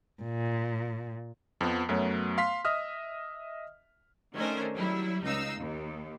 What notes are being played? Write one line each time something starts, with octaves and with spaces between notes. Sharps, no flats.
A#2
F2 F3 B3
F#2 F#3 A3 B3 C#5
F5 C6 B6
D#5 E5 D#6 F6
D#3 A3 C#4 D4 A#4 C5
F#3 G3 E4
C#2 D#4 F5 E6
D#2